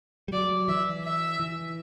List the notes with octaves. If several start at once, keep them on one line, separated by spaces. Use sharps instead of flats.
G3
F#3 D5
E3 E5
E5
E3